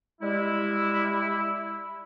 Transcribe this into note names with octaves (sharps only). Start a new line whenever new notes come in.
G3 G#3 E4